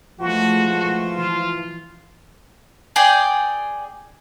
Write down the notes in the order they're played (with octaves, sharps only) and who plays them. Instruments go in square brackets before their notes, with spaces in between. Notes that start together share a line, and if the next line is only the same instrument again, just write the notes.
[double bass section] E3 G#3 A3 [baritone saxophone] F3 [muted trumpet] F#4
[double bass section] E3 [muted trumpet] F4
[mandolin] G#4 D5 G5